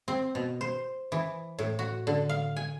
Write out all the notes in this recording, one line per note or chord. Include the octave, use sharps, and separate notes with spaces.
C4
B2
C5
E3
A2
F#4
D3
F5
G#5